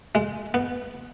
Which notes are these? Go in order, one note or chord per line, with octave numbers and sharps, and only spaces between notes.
G#3
B3